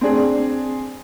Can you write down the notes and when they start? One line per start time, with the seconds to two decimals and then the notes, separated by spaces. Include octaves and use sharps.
0.01 C4 D4 G#4